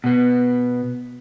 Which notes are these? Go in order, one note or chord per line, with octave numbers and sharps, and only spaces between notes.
B2 B3